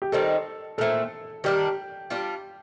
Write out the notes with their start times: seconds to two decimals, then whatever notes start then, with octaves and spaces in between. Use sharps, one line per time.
0.02 G4
0.12 D#3 G3 C4 D#4 A4
0.78 A#2 A3 C4 A4
1.44 D#3 G3 D4 G4
2.10 G3 D4 F4